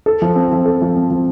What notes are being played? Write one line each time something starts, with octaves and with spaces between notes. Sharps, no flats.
A4
F3
C4
F3
A4
F3
C4
F3